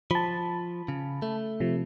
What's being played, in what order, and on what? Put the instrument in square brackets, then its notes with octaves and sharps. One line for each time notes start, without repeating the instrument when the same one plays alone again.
[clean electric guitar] F3 [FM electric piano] A5 B5
[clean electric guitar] C#3
A3
[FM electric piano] C3 F3